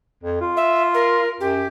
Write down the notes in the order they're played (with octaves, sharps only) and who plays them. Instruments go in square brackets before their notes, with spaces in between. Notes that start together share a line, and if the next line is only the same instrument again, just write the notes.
[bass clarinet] F2
F4
[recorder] E5
A#4
[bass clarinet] F#2 [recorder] G4